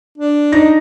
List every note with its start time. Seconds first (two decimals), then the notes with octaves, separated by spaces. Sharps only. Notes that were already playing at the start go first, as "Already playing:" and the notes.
0.18 D4
0.52 D#4 A#6